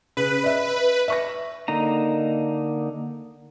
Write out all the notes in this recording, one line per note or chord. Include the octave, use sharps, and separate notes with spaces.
C#3 B4
D#5 E5
E5 C#6 A#6
D3 A#3 D#4 A#5